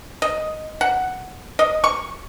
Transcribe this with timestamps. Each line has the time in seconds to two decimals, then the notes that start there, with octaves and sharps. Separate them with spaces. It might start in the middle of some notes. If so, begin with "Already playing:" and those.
0.22 D#5
0.81 F#5
1.59 D#5
1.84 C#6